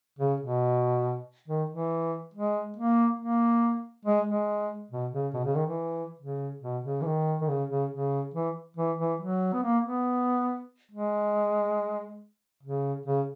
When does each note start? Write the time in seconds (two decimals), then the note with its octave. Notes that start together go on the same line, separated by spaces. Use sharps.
0.19 C#3
0.41 B2
1.48 D#3
1.70 E3
2.34 G#3
2.77 A#3
3.19 A#3
4.05 G#3
4.27 G#3
4.91 B2
5.13 C#3
5.34 B2
5.45 C#3
5.55 D#3
5.67 E3
6.20 C#3
6.63 B2
6.84 C#3
7.02 E3
7.05 D#3
7.41 D#3
7.49 C#3
7.70 C#3
7.91 C#3
8.34 E3
8.77 E3
8.99 E3
9.20 F#3
9.53 B3
9.63 A#3
9.85 B3
10.91 G#3
12.63 C#3
13.06 C#3